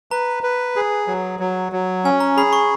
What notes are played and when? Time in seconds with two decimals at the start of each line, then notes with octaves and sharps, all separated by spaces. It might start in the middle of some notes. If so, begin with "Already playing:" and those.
0.11 B4 A#5
0.43 B4
0.76 G#4
1.08 F#3
1.40 F#3
1.72 F#3
2.05 C#4 G#5
2.20 A#5
2.37 G#4 B5
2.53 C#6